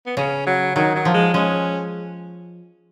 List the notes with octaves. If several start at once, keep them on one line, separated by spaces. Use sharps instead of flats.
B3
C#3 C#4
F#3
D#3 F#3
F#3
F3
G#3
G#3 C#4